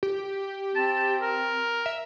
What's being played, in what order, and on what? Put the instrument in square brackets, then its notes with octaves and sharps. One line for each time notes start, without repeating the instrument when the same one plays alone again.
[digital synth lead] G4
[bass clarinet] C4 [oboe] A5
[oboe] A#4
[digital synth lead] E5